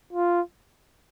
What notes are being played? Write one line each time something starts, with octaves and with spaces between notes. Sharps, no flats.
F4